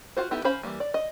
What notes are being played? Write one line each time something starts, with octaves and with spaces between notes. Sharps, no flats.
F4 F#4 C5
B3 D#4 E4 G4 A4
C#4 C5 F5 B5
E3 F3 G3 A#3
D5
D#5